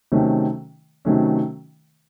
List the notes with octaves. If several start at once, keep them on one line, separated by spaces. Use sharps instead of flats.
C3 D#3 F#3 A3 C#4
C3 D#3 F#3 A3 C#4